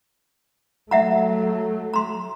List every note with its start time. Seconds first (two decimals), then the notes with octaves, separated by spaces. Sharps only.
0.91 F#3 A3 E5 F#5 A#5
1.94 A#5 C6